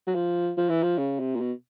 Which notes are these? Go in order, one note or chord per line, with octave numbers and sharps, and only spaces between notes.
F#3
F3
F3
E3
F3
C#3
C3
A#2
B2